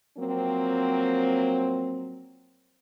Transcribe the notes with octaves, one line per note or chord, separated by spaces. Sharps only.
F3 F#3 A#3 C4